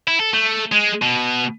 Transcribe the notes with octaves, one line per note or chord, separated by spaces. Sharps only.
E4
A4
A3
G#3
B2